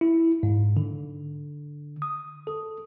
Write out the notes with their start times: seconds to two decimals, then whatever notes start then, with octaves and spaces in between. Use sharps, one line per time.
0.01 E4
0.43 G#2
0.77 D3
2.02 D#6
2.47 A4